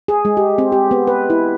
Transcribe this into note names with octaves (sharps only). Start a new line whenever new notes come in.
G#4
G#3
G4
C4
G4
B3
B4
E4